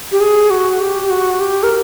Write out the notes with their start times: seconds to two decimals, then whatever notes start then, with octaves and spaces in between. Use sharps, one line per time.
0.12 G4
0.20 G#4
0.50 F#4
0.80 G4
1.10 F#4
1.40 G4
1.63 A#4